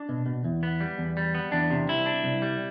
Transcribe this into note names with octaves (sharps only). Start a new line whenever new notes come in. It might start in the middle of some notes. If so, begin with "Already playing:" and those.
Already playing: D4
B2
B2
E2
B3
G3
E2
G3
B3
E2 D4
C3
C2 E4
D4
C2
G3